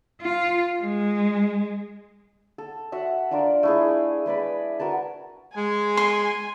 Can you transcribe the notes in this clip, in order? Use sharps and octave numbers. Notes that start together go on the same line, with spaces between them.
F4
G#3
A4
F#4 E5 F#5
D4 F4 A#4 D5
A3 E4 G#4
G#3 B4 D5 B5
F#4 A#4 B4 A5
G#3 G#5
C6